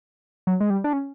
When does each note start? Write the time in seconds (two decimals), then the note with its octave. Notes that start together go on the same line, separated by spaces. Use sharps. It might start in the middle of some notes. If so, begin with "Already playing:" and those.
0.47 F#3
0.60 G#3
0.70 G3
0.84 D4
0.93 C#4